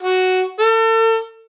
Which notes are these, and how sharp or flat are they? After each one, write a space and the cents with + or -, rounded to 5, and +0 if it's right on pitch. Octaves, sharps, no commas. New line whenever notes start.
F#4 +5
A4 +40